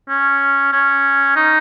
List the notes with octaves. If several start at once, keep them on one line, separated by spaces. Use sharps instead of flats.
C#4
C#4
D#4